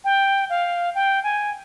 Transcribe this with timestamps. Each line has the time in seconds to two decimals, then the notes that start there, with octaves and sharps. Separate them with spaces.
0.05 G5
0.50 F5
0.95 G5
1.24 G#5